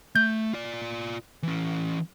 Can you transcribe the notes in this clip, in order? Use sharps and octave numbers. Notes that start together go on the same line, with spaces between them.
A3 G6
F4 D5
E3 C#4